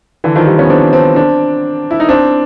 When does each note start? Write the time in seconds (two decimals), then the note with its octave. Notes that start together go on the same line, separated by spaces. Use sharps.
0.24 D3 E3
0.36 D#3 F3
0.47 F3 G3
0.59 B3 C#4
0.70 C4 D4
0.93 C4 D4
1.16 C4 D4
1.91 E4
2.00 D#4
2.09 C4 D4